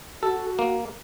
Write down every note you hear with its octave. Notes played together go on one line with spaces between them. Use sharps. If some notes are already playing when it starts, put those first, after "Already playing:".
F#4 A4
A#3